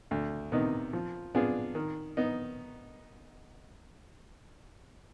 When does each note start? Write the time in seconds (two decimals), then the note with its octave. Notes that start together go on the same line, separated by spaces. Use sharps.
0.11 D2
0.52 C3 D#3 B3 D#4
0.93 F3
1.35 B3 D4 F4 G#4
1.75 D#3
2.17 B3 D#4